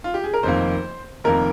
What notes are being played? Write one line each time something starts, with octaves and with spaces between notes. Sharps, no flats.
F4
G4
G#4
A#4
F1 F2 D#3 A#3 C5
F1 F2 D#3 A#3 A#4